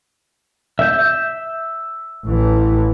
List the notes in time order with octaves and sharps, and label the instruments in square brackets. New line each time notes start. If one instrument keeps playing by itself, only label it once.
[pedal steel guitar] E5 G6
[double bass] A1 E3